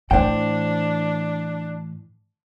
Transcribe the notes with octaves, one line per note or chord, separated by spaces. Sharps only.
A2 E3 D4 C5 G5